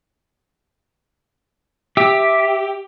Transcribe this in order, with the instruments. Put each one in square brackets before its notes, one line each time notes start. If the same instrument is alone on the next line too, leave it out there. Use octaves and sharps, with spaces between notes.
[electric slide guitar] G4 [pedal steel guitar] E5